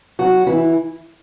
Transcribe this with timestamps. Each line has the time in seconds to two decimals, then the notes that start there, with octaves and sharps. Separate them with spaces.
0.19 F#3 F#4
0.47 E3 E4